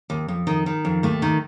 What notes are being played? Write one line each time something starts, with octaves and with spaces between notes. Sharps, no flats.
D#2
F2
D#3
D#3
F2
D#2 A3
D#3